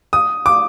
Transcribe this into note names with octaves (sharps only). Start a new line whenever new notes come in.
D#6
D6